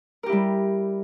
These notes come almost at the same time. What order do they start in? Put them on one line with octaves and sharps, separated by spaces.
A#4 G4 E4 G3